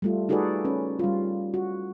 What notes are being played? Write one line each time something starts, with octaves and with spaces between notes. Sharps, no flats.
G3 A3 F4
D#4 F#4 G#4 A4 B4 D5
C#4 B4
G3 F4
F#4